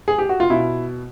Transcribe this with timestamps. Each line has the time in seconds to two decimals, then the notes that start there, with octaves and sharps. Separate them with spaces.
0.08 G#4
0.19 G4
0.29 F#4
0.40 F4
0.50 B2 E4